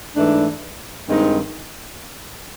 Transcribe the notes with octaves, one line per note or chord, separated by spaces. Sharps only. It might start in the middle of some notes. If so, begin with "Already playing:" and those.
G#2 E3 A3 D4
G2 D#3 G#3 C4 D#4